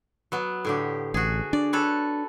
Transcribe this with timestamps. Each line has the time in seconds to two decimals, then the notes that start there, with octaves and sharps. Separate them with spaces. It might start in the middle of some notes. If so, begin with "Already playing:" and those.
0.32 F#3 B3
0.65 A2 D3 G4
1.14 A1 F#4 G#4
1.53 D4 D5
1.73 A4 B4 C#5